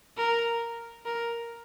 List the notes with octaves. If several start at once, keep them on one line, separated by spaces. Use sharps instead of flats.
A#4
A#4